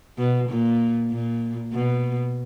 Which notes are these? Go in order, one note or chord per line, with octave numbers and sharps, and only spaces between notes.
B2
A#2
A#2
B2